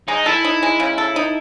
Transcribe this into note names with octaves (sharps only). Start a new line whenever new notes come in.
G#3 D#4
E4 A4
D#4
G#3
C#3
A4
D#4